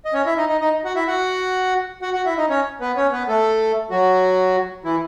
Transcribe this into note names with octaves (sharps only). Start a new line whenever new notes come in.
D#5
C#4 C#5
E4 E5
D#4 D#5
D#4 D#5
D#4 D#5
F#4 F#5
E4 E5
F#4 F#5
F#4 F#5
F#4 F#5
E4 E5
D#4 D#5
C#4 C#5
B3 B4
C#4 C#5
B3 B4
A3 A4
F#3 F#4
E3 E4